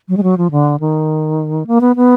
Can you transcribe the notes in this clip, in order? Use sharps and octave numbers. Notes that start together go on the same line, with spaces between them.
F#3
G#3
F#3
F3
D3
D#3
A#3
B3
B3